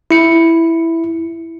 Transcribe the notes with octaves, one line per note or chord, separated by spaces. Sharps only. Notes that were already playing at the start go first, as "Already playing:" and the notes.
E4 C#7